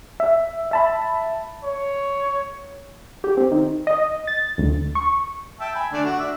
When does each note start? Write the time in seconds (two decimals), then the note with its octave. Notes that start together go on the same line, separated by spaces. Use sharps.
0.20 E5
0.71 E5 A5 B5
1.63 C#5
3.24 G4
3.37 C4
3.51 D#3
3.87 D#5
4.27 A6
4.58 D2
4.95 C#6
5.60 E5 G5 A5
5.75 G#5 B5
5.93 D3 A3 D4
6.04 F#4
6.19 D4 E5